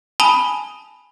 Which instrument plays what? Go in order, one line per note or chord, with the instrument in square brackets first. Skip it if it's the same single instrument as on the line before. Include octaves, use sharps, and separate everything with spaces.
[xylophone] G#5 A5 B5 D#6 F7 G7